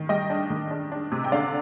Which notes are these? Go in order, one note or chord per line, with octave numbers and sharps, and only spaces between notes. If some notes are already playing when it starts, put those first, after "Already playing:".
Already playing: D#3
G3 D#5 G5
D4
D#3
D4
D4
C3
G5
D3 D5 F5